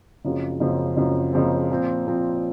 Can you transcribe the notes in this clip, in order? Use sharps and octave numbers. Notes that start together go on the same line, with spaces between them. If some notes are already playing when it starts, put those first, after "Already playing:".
F#1 F#2 C#3 F3 C4
F#1 F#2 C#3 F3 C4
F#1 F#2 C#3 F3 C4
F#1 F#2 C#3 F3 C4
A#2 F3 C4
A#2 F3 C4